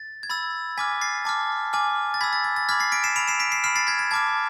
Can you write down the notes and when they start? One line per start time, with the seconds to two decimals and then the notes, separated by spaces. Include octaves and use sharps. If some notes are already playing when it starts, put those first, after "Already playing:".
Already playing: A6
0.23 G#6
0.30 B5 E6 A6
0.77 G#5 D6 F6 G#6 B6
1.01 A6 C7
1.25 A5 D6 F6
1.73 G#5 D6 F6
2.14 A6
2.21 B5 E6 G#6 B6
2.33 A6
2.44 A6
2.56 A6
2.69 B5 D6 F6 G#6 B6
2.80 A6 C7
2.92 B6 D7
3.04 C7 E7
3.16 B5 E6 D7 F7
3.28 C7 E7
3.40 B6 D7
3.52 C7 E7
3.64 B5 F6 C7 E7
3.76 A6 C7
3.87 G#6 B6
3.99 G#6
4.11 A5 D6 F6 G#6